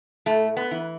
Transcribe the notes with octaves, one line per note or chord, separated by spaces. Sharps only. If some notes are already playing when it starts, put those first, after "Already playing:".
A2 A3
B3
E3